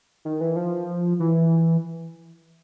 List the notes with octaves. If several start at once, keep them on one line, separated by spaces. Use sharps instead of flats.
D#3
E3
F3
E3